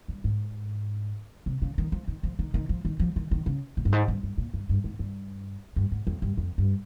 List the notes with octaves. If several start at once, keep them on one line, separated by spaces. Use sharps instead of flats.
G2
G#2
C3
C#3
D#3
F3
D#3
F3
D#3
D#3
F3
D#3
F3
D#3
D#3
C#3
A#2
G2
G#2
G2
G2
A#2
G2
G2
G#2
G2
G2
G#2
F2
G2
F2
G2